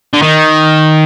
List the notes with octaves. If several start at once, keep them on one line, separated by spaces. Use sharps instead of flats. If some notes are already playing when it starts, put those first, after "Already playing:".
D3
D#3